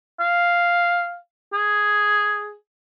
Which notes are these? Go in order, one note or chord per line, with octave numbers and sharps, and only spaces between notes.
F5
G#4